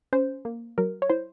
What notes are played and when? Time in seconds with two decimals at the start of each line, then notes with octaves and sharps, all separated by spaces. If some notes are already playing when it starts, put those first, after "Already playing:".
0.13 C#4 C5
0.45 A#3
0.78 F#3 A#4
1.02 C#5
1.10 E4 C5